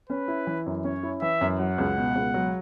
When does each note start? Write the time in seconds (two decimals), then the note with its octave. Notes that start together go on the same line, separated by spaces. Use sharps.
0.09 C#4 B4
0.28 E4
0.47 E3
0.66 F#2
0.84 C#4 C#5
1.03 E4
1.22 E3 E5
1.41 F#2
1.59 F#3 F#5
1.78 C#2
1.97 B2
2.16 C#2
2.34 F#3